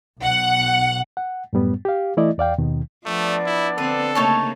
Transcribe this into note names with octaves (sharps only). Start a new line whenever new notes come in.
B1 F#5
F#5
F#2 A2 G3 B3
G4 F5
E3 A3 E4 D5 D#5
E2 D5 F5 G5
D#2 B2 D#3
F3 A3 B3 D4 D5
E4
D3 C4 A4 B4
C#3 A3 A#3 D#4 C#5 A5